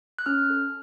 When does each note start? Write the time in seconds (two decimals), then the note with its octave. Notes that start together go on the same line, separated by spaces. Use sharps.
0.19 F#6
0.26 C#4 F6
0.50 A4